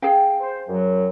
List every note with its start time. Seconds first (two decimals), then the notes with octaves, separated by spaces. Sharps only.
0.02 G#4 F5 G5
0.41 C5
0.68 F#2 F#3